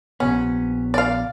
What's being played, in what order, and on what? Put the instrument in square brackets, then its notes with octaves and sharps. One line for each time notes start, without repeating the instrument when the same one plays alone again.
[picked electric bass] A#1 C3 B3 [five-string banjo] C#4
[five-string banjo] D5 F5